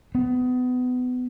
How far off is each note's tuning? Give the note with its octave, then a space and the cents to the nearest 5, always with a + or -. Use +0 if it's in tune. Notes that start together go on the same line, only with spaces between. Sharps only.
B3 +25